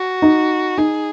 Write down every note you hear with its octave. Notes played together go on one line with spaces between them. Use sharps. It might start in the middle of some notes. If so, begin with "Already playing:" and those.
Already playing: F#4
D#4
D#4 G#4